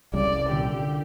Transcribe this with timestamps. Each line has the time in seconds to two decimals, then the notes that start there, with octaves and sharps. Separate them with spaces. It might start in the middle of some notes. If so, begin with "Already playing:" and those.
0.14 C2 C#3 G3 D5
0.49 A#2 D3 G4